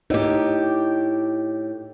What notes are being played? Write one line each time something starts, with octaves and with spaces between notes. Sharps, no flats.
A2 D#4 G4